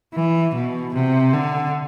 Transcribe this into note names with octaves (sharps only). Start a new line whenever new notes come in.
E3
B2
C3
D3